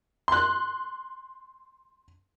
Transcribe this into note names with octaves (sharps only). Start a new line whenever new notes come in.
C6 F#6